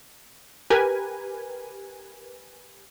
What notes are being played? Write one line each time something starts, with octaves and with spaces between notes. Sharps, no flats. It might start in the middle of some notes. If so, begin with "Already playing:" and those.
G4 A#4 B4 G#5